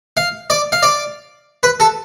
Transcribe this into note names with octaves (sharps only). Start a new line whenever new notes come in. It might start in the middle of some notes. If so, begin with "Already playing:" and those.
F5
D5
F5
D5
B4
A4